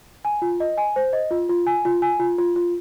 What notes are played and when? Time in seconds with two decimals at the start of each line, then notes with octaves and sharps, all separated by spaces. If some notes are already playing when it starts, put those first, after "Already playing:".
0.25 G#5
0.42 F4
0.60 D#5
0.78 G#5
0.96 C5
1.13 D#5
1.31 F4
1.49 F4
1.67 G#5
1.85 F4
2.02 G#5
2.20 F4
2.38 F4
2.56 F4